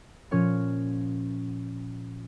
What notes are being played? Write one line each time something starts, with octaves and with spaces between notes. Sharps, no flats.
A#2 F3 C#4 C#5 F6